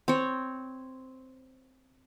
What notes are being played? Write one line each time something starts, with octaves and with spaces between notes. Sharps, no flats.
C4 C#5